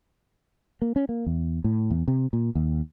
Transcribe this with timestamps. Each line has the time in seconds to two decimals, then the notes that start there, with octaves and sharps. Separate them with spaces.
0.82 A#3
0.96 C#4
1.09 A#3
1.26 E2
1.64 A2
1.90 E2
2.08 C3
2.33 A#2
2.55 D#2